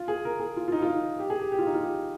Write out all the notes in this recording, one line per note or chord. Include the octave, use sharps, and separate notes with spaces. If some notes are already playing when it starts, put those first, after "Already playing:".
Already playing: F4
G#4
A#4
G#4
F4
F4
D#4
F4
D#4
G4
G#4
G4
G4
F4
D#4
F4
G4